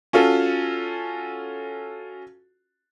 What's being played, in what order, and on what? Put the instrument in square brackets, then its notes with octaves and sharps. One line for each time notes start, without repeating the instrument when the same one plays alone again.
[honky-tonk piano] C#4 F4 F#4 A4